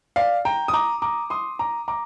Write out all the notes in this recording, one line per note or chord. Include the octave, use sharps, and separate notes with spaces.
D5 F5
G5 A#5
D#6
A#5 D6
A#5 D6
C6 D#6
A#5 D6
A#5 D6